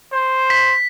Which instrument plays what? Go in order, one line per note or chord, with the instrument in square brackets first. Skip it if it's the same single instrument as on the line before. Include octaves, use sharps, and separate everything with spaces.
[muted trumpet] C5
[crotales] B6